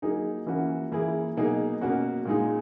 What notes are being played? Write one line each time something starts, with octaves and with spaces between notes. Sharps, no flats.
F#3 A#3 D#4 G#4
E3 A#3 C#4 F#4
E3 A#3 E4 G#4
B2 F#3 A#3 D#4 G#4
B2 A#3 C#4 F#4
A#2 G#3 D#4 G#4